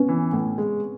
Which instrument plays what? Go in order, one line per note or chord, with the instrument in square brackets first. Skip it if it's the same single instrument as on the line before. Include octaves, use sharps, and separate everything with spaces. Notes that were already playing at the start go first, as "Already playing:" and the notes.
Already playing: [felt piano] B3 C#4
[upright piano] E3
A2
G#3